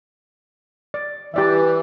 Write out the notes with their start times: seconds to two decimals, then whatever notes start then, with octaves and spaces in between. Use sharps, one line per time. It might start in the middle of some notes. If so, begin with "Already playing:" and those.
0.94 D5
1.34 E3 G4 D5 E5